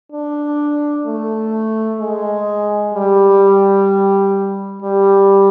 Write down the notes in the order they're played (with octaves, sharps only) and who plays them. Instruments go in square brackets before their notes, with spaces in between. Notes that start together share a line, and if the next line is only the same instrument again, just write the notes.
[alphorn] D4
A3
G#3
G3
G3